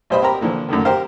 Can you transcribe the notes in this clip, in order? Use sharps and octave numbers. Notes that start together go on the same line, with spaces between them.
B1 G3 C5 D#5 B5
C4 G4 A#4 A#5 B5
A#2 D3 E3 F3
F#2 A2 D3 D#3
G4 A#4 C5 F5